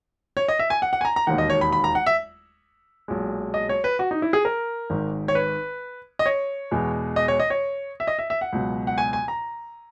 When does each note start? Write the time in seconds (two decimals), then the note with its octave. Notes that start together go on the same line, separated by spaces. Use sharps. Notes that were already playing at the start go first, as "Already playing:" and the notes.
0.37 C#5
0.48 D#5
0.59 E5
0.70 G#5
0.82 F#5
0.93 F#5
1.01 G#5
1.05 A#5
1.16 A#5
1.27 E1 D#2 D#3 F#5
1.38 D#5
1.50 C#5
1.61 B5
1.72 B5
1.84 A#5
1.95 F#5
2.06 E5
3.08 B1 A#2 G#3
3.54 D#5
3.69 C#5
3.84 B4
3.99 F#4
4.11 D#4
4.22 E4
4.33 G#4
4.45 A#4
4.90 G#1 G#2 D#3
5.28 C#5
5.35 B4
6.19 D#5
6.26 C#5
6.71 E2 B2 G#3
7.16 D#5
7.28 C#5
7.40 D#5
7.50 C#5
8.00 E5
8.07 D#5
8.19 E5
8.30 E5
8.41 F#5
8.52 C#2 B2 F#3
8.87 F#5
8.98 G#5
9.13 G#5
9.28 A#5